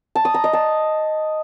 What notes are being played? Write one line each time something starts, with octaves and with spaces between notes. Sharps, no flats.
A5
D#6
A#5
D#5
A5